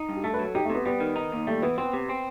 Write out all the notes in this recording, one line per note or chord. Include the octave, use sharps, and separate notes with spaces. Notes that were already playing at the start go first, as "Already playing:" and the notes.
Already playing: D#4
G2
G4
A3 A4
B4
F#3
A4
D#4 G4
A3
C3 B3
G3 B3
D#3
D#4
D#2
G3 A3
E3 B3
B3 C4
C3
C4